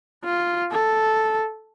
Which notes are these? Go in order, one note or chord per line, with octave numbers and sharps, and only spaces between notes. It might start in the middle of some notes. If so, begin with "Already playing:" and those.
F4
A4